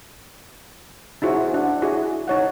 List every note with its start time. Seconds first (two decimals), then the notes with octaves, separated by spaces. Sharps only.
1.22 D#4 E4 F#4 G#4 C5
1.54 D4 D5 F#5
1.82 E4 F#4 G#4
2.28 D#4 C#5 F#5